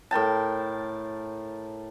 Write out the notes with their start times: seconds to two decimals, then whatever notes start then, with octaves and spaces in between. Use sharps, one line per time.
0.11 A2 A#4 G5 A5